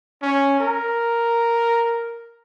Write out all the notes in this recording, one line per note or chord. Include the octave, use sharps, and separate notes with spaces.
C#4
A#4